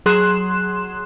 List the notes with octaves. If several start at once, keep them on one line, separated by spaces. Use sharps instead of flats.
F#3 G#4 C6 F#6 E7